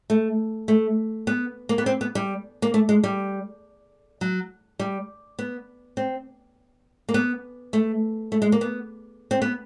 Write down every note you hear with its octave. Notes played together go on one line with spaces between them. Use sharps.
A3
A3
B3
A#3
B3
C4
B3
G3
A#3
A3
G#3
G3
F#3
G3
B3
C4
A#3
B3
A3
A3
G#3
A#3
B3
C4
B3